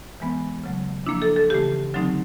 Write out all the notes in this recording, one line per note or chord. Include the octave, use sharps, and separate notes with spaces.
E3 G#3 B3
C#3 F#3 A3
F3 A#3 D4 E4
A4
A4
C#3 E3 A3 G4
D3 F#3 A3 C4 D#4